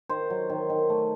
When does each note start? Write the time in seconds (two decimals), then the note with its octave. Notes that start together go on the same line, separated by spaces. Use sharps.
0.09 D#3 C5
0.30 F#3
0.50 D#3
0.70 D#3
0.90 A3